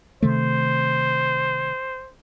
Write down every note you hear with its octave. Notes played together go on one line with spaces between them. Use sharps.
C3 D#3 A3 C5